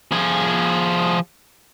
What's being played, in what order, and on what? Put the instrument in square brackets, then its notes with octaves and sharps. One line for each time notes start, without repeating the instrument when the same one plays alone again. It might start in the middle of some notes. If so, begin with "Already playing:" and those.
[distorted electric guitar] F3 G#4